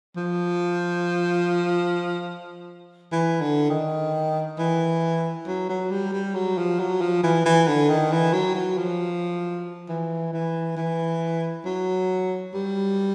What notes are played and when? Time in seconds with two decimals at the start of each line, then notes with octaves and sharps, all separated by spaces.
0.16 F3
3.12 E3
3.41 D3
3.70 D#3
4.59 E3
5.47 F#3
5.69 F#3
5.91 G3
6.13 G3
6.35 F#3
6.58 F3
6.80 F#3
7.01 F3
7.23 E3
7.45 E3
7.68 D3
7.89 D#3
8.12 E3
8.33 F#3
8.55 F#3
8.78 F3
9.89 E3
10.33 E3
10.77 E3
11.65 F#3
12.54 G3